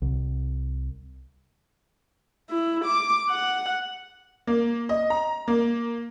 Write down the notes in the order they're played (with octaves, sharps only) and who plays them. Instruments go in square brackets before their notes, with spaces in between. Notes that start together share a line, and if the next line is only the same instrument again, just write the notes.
[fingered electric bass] C2
[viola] E4
D6
F#5
[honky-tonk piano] A#3
D#5
A#5
A#3